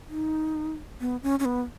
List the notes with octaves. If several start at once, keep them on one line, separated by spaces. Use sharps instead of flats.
D#4
B3
C#4
C#4
B3